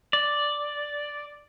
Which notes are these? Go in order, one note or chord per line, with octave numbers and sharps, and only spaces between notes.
D5